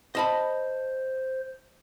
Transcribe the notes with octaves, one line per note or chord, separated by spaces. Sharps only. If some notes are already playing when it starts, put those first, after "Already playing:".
C5 D#5 A5 B5